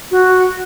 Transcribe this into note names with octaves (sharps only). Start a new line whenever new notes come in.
F#4